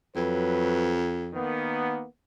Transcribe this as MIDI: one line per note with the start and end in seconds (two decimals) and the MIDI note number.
0.16 1.44 41
0.16 0.99 54
0.16 0.99 71
1.34 2.04 51
1.34 2.04 58
1.34 2.04 59